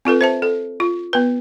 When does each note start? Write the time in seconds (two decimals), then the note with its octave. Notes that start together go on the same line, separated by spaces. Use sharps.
0.05 C4 F4 A4 B4
0.21 C5 E5 A5
0.42 A4
0.80 F4
1.13 B3 B4